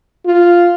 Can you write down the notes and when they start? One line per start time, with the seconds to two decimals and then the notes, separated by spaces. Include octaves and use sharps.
0.25 F4